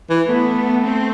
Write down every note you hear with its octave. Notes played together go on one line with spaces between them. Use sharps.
E3
A3 B3
C4